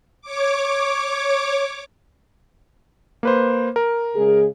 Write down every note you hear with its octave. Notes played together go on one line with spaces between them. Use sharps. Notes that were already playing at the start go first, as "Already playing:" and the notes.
C#5 D6
A#3 B4 C5
A#4
C#3 G#3 G#4